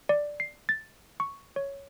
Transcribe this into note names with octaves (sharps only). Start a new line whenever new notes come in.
D5
C7
A6
C#6
C#5